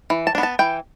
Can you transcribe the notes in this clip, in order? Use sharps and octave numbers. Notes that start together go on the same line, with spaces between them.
E3
A5
D4
B3
A5
E3 G5